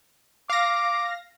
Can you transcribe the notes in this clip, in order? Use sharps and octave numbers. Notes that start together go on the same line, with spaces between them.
F5 D6 A#6